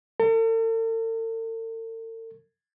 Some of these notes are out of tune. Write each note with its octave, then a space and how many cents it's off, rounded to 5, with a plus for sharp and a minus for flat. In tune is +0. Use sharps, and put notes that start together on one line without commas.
A4 +45